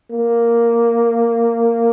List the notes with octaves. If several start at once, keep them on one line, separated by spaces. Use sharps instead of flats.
A#3